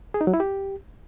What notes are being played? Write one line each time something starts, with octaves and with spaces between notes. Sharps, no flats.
G#4
D#4
F#3
E4
G4